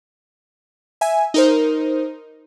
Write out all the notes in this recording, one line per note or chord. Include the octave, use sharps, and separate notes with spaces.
E5 G#5
D#4 A#4 C5